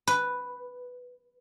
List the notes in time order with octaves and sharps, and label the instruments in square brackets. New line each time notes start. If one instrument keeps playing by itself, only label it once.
[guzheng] B4